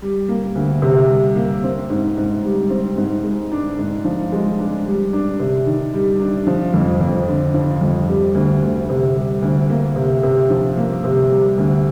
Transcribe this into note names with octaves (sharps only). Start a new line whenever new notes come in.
G3
A#3
D2
C3
G3
A#3
C4
G#2
G#2
G3
C4
G#2
G#3
D4
G#2
F3
G#3
D4
G3
D4
C3
D#3
G3
D4
F3
F2
F2
D3
F3
F2
G3
D2
D2
C3
G3
D2
A#3
C3
C3
F3
A#3
C3
G3
D2